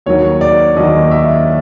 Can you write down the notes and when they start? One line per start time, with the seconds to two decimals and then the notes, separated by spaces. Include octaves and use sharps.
0.06 D#2 D#3 F#3 C#5
0.41 D5
0.76 D#2 D#3 F#3 D#5
1.11 E5